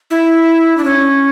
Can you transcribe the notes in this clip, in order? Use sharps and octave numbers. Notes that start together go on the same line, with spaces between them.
E4
D4
C#4